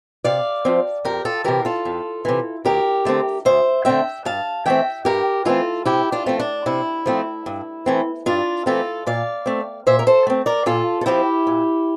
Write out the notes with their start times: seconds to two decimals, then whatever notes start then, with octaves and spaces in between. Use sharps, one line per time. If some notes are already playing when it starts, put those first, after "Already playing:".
0.24 C3 D5 F5
0.65 F3 C4
1.05 F2 G4 A#4
1.25 F4 A4
1.44 C3 E3 G4 A#4
1.65 F4 A4
1.85 F2
2.25 C3 E3
2.65 D2 G4 A#4
3.05 D3 A3 C4
3.45 D2 C5 E5
3.85 D3 A3 C4 E5 G5
4.25 G2 F5 A5
4.66 E3 A3 C4 E5 G5
5.05 G2 G4 A#4
5.45 E3 A3 C4 F4 A4
5.85 C3 E4 G4
6.12 D4 F4
6.26 F3 A3 C4
6.40 D4
6.66 C3 E4
7.06 F3 A3 C4
7.46 G2
7.86 E3 A3 C4
8.26 G2 D4 F4
8.66 E3 A3 C4 F4 A4
9.06 A#2 D5 F5
9.46 A3 C4
9.87 A#2 C5 E5
9.99 A#4
10.07 A4 C5
10.27 A3 C4
10.46 A#4 D5
10.66 A#2 F4 A4
11.01 A4
11.06 F3 C4 E4 G4
11.47 A#2